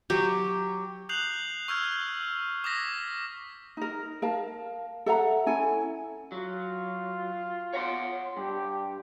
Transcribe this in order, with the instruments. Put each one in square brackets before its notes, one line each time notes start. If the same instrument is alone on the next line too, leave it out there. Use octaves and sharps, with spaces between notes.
[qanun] F#3 G4
[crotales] D#6 F#6 G6 C7 F7 F#7
C#6 E6 F6 G6 G#6 D#7
D6 D#6 G#6 A#6 B6
[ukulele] D#4 A#4
A#4 F5 A5
A4 E5 F#5 A#5
C#4 E4 A4 G#5
[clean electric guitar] F#3 [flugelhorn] F4
[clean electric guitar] C#5 F#5 C6
[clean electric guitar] G2 [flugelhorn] G4